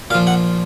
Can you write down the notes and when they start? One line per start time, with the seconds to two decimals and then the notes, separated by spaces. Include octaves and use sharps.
0.10 A#2 F5
0.14 F3
0.27 F#5